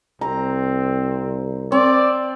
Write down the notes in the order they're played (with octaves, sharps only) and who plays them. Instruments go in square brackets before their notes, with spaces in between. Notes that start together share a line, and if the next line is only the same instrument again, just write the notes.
[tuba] C2 [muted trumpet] C4 [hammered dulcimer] A#5
[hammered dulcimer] C4 [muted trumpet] D5